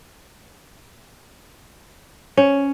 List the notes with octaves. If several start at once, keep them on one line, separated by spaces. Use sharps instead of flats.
C#4